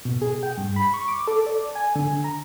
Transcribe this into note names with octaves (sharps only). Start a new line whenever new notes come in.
B2
G#4
G5
G2
B5
C#6
D6
A4
D5
G#5
D3
A#5